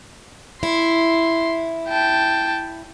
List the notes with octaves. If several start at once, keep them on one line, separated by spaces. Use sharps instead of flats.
E4 C6
G5 A5